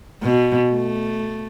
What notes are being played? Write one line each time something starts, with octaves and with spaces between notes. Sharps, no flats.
B2
A3